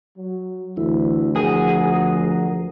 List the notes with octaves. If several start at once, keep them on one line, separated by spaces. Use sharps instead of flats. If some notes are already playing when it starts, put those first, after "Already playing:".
F#3
D2 E3 E4
F3 G#4 A#4 F#5